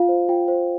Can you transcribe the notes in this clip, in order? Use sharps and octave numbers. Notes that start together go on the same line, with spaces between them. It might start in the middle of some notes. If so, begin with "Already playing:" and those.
Already playing: F4 F5
C5
F4 G5
C5